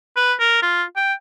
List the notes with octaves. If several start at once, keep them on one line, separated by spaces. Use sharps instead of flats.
B4
A#4
F4
G5